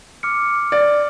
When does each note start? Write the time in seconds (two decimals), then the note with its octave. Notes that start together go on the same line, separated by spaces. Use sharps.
0.23 D6 F6 C#7
0.72 D5